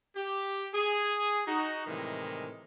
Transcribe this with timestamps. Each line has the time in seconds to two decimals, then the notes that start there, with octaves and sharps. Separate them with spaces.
0.16 G4
0.75 G#4
1.47 D#4 F#4
1.87 A2 C3 D#3 E3 G3 G#3